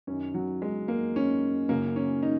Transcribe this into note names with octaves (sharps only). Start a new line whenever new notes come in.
F#2 D#3 C#4
F#3
G#3
A#3
C#4
F#2 C#3 A#3
C#4
D#4